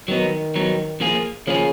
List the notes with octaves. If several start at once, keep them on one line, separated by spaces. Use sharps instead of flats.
D#3 F#3 B3 D#4
F#3 B3 D#4
F3 A#3 F4 G#4
C#3 F3 A#3 F4 G#4